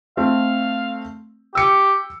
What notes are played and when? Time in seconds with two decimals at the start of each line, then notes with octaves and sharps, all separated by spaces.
0.17 A3 C4 F5
1.55 G4 E6 C#7